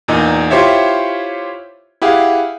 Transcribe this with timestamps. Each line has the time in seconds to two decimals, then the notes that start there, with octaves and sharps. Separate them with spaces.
0.08 E2 A#2 D#4 D#5
0.51 E4 F4 G4 C5 C#5 E5
2.02 E4 G4 G#4 F5 F#5